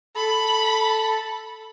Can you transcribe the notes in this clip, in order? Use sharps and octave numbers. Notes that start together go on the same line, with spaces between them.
A4 B5